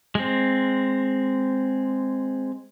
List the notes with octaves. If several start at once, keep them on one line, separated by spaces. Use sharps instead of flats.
G#3 C4